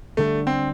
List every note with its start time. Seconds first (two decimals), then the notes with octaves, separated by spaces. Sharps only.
0.17 D2 D3 G3 A3 D4
0.47 C4